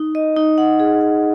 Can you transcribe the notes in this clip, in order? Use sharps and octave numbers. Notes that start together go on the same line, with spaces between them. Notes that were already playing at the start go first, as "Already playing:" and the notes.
Already playing: D#4
D#5
D#4
F#5
G#4
F#5